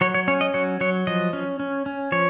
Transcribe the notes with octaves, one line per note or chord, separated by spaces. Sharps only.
F#3 C#5
C#5
C#4 C#5
D#5
F#3 C#5
F#3 C#5
F3 D#5
C#4
C#4
C#4
F3 C#5